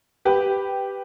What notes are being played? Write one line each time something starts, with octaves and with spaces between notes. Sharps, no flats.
G4 B4